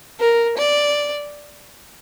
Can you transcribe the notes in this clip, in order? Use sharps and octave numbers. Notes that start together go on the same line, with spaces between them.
A#4
D5